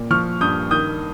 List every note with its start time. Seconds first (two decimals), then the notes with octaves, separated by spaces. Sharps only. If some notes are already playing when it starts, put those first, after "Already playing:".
Already playing: A#2
0.10 F3 C#6 F6
0.41 G2 D#6 G6
0.71 D#3 D#6 G6